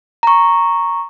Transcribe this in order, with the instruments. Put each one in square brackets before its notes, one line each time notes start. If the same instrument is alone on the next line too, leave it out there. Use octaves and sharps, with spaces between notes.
[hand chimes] A#5 C#6